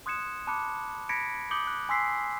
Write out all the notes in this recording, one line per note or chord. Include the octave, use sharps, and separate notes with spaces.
C6 D#6 F#6 G#6 C#7 E7
A5 B5 D6 F#6 C#7
B5 G#6 A#6 B6 C#7 D7
D6 D#6 G6 C#7 F#7 G7
F#6
G#5 C6 E6 B6 C7